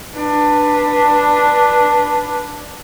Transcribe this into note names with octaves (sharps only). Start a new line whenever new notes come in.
D4 B4